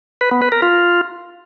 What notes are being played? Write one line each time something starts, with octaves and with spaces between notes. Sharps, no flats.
B4
B3
B4
A#4
F4